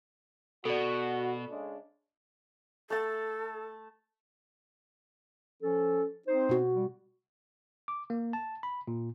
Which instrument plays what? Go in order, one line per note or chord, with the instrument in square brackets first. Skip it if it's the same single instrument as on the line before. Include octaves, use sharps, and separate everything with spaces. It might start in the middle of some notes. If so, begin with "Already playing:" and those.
[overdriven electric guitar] B2 [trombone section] F#4 [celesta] A4 D5
[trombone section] C#3 G#3 D4
[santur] A3 A5 [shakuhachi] A4
[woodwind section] F3 C#4 A4
C4 D#4 C5
[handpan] B2 F#4
[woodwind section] G3
[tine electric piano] D6
A#3
A5
B5
A#2